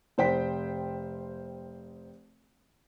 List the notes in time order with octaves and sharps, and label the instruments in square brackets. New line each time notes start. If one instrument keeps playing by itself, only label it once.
[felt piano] F1 C5 G5 B6